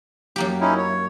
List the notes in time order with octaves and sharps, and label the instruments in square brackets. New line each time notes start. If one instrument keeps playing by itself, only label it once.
[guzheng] F#2 A#3 G4
[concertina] C#4 D#4 E4
C#5